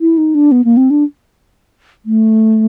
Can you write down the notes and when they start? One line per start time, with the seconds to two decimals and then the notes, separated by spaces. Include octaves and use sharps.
0.01 E4
0.18 D#4
0.35 D4
0.52 B3
0.64 A#3
0.77 C4
0.90 D4
2.06 A3